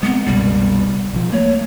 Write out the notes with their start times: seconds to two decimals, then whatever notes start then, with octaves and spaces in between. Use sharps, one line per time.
0.03 G#3 A3 B3 C4
0.26 F#1 C2 B2 G3
1.13 B1 F3
1.33 A3 A#3 C#5